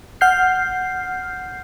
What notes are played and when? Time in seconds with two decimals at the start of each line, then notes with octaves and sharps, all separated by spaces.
0.21 F#5 F6 G6 C7